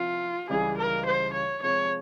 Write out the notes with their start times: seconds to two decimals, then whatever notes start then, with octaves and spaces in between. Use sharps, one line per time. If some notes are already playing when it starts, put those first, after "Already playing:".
Already playing: C3 F3 C4 E4 F4
0.49 C#2 C#3 E3 G3 G#4
0.78 A#4
1.05 C5
1.34 C#5
1.62 C3 F3 G#3 C#5